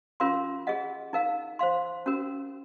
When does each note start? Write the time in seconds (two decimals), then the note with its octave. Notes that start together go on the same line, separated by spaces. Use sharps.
0.20 C#4 F4 A#4 F5 C6
0.67 G#4 D#5 F#5
1.13 D#4 A#4 F5
1.59 C5 F5 C6
2.06 C#4 F#4 A#4